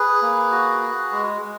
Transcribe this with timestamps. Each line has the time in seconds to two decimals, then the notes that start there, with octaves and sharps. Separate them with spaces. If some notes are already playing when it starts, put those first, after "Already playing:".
Already playing: G#4 B4
0.22 A#3
0.51 F#4
0.82 F#4
1.12 G#3
1.41 G#3